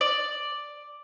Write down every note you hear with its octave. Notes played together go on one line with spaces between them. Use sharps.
D5